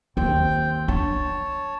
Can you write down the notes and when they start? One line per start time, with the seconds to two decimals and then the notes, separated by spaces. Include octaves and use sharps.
0.17 D#2 C4 G5
0.88 D4 C#5 A5